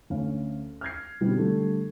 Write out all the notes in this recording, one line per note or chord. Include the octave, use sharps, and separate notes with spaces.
D2 C#4 F5
F6 G6 G#6 C7
B2 D3 G3 C4 E4 G4
D3 G3 A3